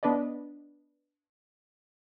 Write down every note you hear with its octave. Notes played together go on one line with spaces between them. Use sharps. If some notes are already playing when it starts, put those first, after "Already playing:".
B3 D4 B4 D5 D#5